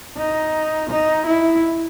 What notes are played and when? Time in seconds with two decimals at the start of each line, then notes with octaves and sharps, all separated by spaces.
0.17 D#4
0.90 D#4
1.26 E4